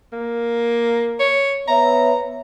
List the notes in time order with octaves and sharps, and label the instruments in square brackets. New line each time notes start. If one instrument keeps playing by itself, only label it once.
[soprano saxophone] A#3
C#5
[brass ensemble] B3 C#5 E5 [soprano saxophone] A#5